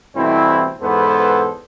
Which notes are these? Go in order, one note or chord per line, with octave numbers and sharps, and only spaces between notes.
G2 B2 E3 A3 C4 E4
E2 G#2 B3 A4 B4 C5